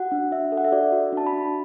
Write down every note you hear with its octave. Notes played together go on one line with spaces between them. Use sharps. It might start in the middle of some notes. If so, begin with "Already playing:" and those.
Already playing: F#4 F#5
D4
D4 E5
A4
F#5
E5
F#4 D5
F#4
D4 A5
B5
D4